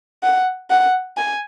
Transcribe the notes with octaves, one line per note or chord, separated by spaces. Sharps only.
F#5
F#5
G#5